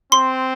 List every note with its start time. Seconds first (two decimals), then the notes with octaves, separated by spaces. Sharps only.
0.12 C4 C6